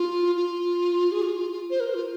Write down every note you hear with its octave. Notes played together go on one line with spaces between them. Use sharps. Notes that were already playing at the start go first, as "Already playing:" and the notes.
Already playing: F4
F4
G#4
F4
F4
F4
C5
A#4
F4